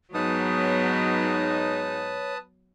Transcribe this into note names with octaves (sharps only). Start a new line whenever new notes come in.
G#2 F#3 B3 D#4 B4 C#5 A5 D#6